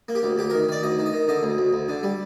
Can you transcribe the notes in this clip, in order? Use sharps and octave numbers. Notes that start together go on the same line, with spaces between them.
A#3
G4
D2
D2 G4
A#4
D#3
D#3 D5
D2 D#5
D#3
D#5
D#3
D3 D#5
D2
D2
D2
D3
G3